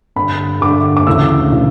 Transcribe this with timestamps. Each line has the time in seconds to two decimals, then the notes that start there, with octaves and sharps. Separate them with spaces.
0.16 G2 D3 B5
0.61 G2 D3 D6
0.97 D6
1.07 D2 C#3 E3 E6
1.52 C#3 E3